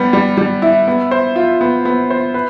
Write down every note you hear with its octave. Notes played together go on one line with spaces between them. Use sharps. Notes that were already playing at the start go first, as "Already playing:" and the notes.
Already playing: G3 B3
G3
G3
E4
B3
C5
F4
B3
B3
C5
B4